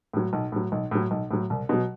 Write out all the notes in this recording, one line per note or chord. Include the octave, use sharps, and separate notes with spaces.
A2 F#3
B1
A2 F#3
B1
A2 F#3
B1
A2 F#3
C2
B2 F#3